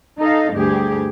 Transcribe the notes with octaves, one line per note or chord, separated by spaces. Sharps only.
D#4 A4 D#5 F5
D2 G2 G4 G#4